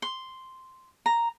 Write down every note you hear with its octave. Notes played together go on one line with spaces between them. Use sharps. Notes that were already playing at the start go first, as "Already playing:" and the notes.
C6
A#5